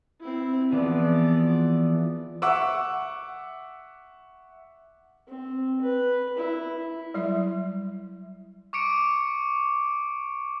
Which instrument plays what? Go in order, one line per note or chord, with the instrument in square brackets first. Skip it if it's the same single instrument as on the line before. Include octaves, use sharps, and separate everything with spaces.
[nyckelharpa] C4 E4
[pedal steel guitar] E3 F3 B3 [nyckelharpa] G#4 D5
[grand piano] E5 F#5 C#6 D6 E6
[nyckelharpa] C4
B4
E4
[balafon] F#3 G3 E4 E5
[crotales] C#6 D6 C#7 D7